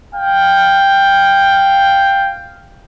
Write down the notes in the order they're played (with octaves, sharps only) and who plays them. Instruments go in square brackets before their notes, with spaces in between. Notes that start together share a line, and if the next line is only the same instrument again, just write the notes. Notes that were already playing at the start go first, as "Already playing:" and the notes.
[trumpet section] F5 G5